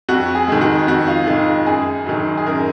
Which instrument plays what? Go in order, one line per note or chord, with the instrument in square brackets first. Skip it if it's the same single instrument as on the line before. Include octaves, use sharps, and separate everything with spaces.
[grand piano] F2 F#4
G#4
D#3 G#3
F#4
F2 F#4
F4
D#3 G#3 F4
F#2 G#4
D#3 F#3
G#4
F#2 A#4